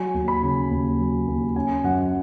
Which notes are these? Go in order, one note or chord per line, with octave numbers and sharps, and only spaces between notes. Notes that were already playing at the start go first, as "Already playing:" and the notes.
Already playing: F#3 G#5
D#2
B5
C#3
D#2
F#3
D#2
C#4 G#5
F#2 F#5